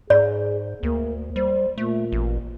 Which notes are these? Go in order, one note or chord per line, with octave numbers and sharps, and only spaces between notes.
G#2 G#4 D5
D2 A#3
G3 C5
A#2 A3
A1